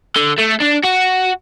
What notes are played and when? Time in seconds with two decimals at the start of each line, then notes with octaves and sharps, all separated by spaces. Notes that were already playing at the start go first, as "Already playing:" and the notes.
0.16 D3
0.39 A3
0.62 D4
0.85 F#4